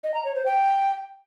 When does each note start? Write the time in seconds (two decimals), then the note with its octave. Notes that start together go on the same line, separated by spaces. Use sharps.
0.04 D#5
0.14 A#5
0.25 C#5
0.35 C5
0.46 G5